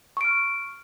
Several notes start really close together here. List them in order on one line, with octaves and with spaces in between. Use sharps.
C#6 D7 F6